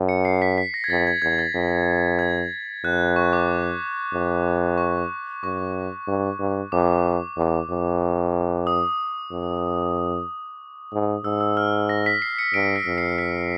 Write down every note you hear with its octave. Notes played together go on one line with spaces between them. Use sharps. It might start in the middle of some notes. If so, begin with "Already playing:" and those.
Already playing: F#2
C#7
C7
B6
B6
A#6
G#6
F2 A6
G#6
E2 G#6
A6
F2
G#6
F2 F#6
C#6
D6
F2
C#6
F#2 C#6
G2
G2
F2 D6
E2
F2
D#6
F2
G#2
G#2 E6
E6
F6
A#6
B6
C7
C#7
G2 D7
B6
F2
C7
B6